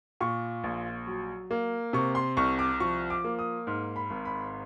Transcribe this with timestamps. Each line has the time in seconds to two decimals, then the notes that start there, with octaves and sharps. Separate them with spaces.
0.21 A#2 C#6
0.64 A#1
1.07 F#3
1.51 A#3
1.93 C3 C#6
2.15 C6
2.37 C2 C#6
2.59 D6
2.80 F3 C#6
3.10 D6
3.24 A#3
3.39 D#6
3.67 G#2 F6
3.96 B5
4.10 G#1
4.25 B5